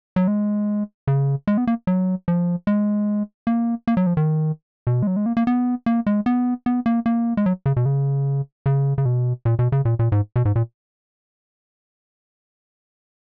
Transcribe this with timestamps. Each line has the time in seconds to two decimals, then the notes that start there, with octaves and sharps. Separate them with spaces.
0.16 F#3
0.28 G#3
1.07 C#3
1.47 G#3
1.57 B3
1.67 A#3
1.87 F#3
2.28 F3
2.67 G#3
3.47 A#3
3.87 A#3
3.97 F#3
4.07 F3
4.17 D#3
4.87 B2
5.03 G#3
5.07 F#3
5.16 G#3
5.26 A#3
5.37 A#3
5.47 B3
5.86 A#3
6.07 G#3
6.26 B3
6.66 B3
6.86 A#3
7.06 A#3
7.37 G#3
7.46 F#3
7.66 C#3
7.77 B2
7.86 C#3
8.66 C#3
8.98 C#3
9.05 B2
9.45 A#2
9.59 B2
9.72 C#3
9.85 A#2
9.99 A#2
10.12 G#2
10.36 B2
10.45 G#2
10.56 A#2